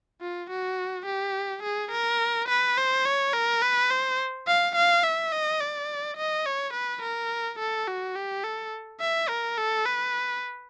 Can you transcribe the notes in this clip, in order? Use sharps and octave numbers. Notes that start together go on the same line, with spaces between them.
F4
F#4
G4
G#4
A#4
B4
C5
C#5
A#4
B4
C5
F5
F5
E5
D#5
D5
D#5
C#5
B4
A#4
A4
F#4
G4
A4
E5
A#4
A4
B4